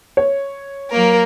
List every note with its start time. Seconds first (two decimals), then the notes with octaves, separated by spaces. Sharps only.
0.17 C#5
0.90 F#3 A#3 A#4